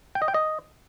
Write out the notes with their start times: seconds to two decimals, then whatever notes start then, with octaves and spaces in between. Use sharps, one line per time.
0.15 G5
0.22 D#5
0.28 G5
0.34 D#5